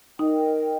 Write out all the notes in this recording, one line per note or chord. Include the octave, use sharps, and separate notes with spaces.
D#4 A#4 D#5 G5